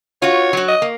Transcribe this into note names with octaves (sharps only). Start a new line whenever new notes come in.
F4 F#4 C#5
F#3 F#4
D#5
A#3